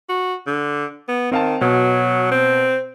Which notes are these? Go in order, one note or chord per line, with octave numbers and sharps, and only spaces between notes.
F#4
D3
B3
D#3 C4 F5 A5
B2 F#3
C4